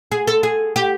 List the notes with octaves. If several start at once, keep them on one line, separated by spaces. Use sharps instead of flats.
G#4
A4
G#4
G4